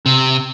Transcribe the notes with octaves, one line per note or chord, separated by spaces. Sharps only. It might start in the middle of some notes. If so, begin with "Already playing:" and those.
C3